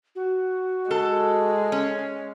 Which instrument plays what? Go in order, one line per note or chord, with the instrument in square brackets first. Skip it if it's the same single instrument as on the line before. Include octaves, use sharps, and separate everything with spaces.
[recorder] F#4
[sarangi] G#3 [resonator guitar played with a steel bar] A4
[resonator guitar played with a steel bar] C#4